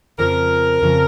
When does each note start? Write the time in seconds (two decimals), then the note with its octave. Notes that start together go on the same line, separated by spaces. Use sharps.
0.19 F2 C#3 F3 A#4
0.82 F2 C#3 F3